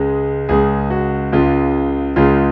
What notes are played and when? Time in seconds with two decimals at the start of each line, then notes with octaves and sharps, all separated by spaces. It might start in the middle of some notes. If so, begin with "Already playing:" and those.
Already playing: C#2 C#3 G#3 G#4
0.49 C#2 C#3 G#3 G#4
0.90 F#4
1.32 C#2 C#3 G#3 F4
2.16 C#2 C#3 G#3 F4